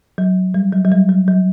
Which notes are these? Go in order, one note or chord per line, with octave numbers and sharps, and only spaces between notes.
F#3
G3
F#3
F#3
G3
F#3
F#3